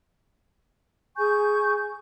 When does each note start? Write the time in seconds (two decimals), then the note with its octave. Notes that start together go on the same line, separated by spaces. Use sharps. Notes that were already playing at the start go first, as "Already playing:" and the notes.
1.16 G#4 G#5 C#6 G6